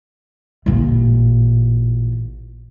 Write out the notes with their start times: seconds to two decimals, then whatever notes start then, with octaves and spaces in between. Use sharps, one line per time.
0.66 A1 A#2